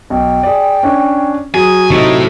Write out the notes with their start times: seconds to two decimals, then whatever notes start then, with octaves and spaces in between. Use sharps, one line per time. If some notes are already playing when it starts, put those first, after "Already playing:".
0.10 B1 G5
0.43 G#4 D5
0.83 C#4 D4 C#5
1.54 F#3 G#4 G#5
1.90 C3 A3 D#4 E4